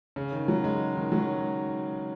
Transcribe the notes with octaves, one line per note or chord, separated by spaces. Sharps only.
C#3
D#3
F#3
G#3
D#3
F#3